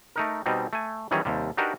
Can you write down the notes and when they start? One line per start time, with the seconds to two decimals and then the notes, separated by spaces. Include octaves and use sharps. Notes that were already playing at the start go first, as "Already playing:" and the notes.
0.16 A3 D#4 A#4
0.46 B2 G3 C4 D#4
0.73 A3 G#5
1.11 D#3 E3 F#3 G3 C#4 G#4
1.25 D#2 C3 G3
1.57 D4 D#4 F#4 G4 A#4 B4